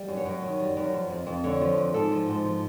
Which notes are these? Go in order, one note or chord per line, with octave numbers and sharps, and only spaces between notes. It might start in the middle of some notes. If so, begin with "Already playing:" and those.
Already playing: G3
F#2
C#5
F#2
D#3
G3
F#2
F3
F2
F2
D3 C#5
F3
F2
G#2 A4
F3
G#2
F3